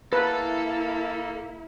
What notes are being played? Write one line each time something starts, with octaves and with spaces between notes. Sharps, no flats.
A#3 E4 A4 B4 A5